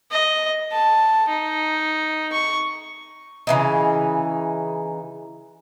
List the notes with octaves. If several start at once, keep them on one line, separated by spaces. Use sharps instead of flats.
D#5
A5
D#4
C#6
C#3 E3 D#4